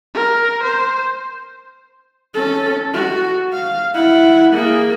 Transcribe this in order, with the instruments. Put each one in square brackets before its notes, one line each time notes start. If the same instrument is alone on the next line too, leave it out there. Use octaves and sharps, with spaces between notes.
[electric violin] A#4
C5
[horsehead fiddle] C#4 A4
F#4
F5
E4 F#5
A#3 G#4